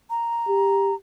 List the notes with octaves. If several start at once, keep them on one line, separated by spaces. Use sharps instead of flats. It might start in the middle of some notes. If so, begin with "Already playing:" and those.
A#5
G4